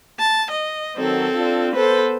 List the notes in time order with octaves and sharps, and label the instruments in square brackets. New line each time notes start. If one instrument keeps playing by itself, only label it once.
[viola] A5
D#5
[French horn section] D#3 F#3 [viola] C4 A4
[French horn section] D4 F4
[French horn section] B3 C5 [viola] A4 B4